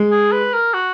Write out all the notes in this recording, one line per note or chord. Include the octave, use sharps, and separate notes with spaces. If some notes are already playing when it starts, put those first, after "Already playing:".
Already playing: G#3
G#4
B4
A#4
F#4